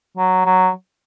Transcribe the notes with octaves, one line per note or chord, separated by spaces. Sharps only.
F#3
F#3